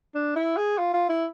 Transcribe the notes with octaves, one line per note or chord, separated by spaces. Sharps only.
D4
E4
G#4
F4
F4
E4